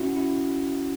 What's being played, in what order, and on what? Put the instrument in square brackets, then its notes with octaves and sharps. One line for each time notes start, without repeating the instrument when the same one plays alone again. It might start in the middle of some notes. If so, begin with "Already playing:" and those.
Already playing: [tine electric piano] C#4 E4 F#4
E4